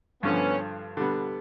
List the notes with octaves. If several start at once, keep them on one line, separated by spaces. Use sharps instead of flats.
G2 D3 F3 B3 C#4
D3 G3 B3